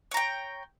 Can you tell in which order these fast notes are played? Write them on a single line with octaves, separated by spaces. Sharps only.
C#5 A#5 G5